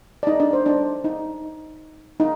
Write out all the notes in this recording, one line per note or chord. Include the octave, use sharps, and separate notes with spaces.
D5
D#4 D#5
D4 D5
C5
D4 D5
D#4
D#4